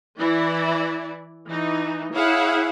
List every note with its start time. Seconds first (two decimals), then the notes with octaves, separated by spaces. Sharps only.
0.18 E3 E4 D5
1.47 E3 D#4
2.13 E4 G#4 C#5 F5 F#5